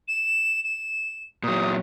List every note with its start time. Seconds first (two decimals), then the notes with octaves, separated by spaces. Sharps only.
0.08 E7
0.64 E7
1.43 A#2 F#3 D#6